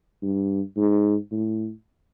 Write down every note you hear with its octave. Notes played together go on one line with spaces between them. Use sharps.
G2
G#2
A2